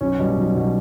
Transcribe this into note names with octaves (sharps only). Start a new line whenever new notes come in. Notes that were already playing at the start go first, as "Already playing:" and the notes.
B1 C#4
B2 G3
B1
B2 G3